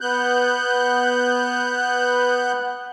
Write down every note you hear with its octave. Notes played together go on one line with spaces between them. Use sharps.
B3 F#6 G6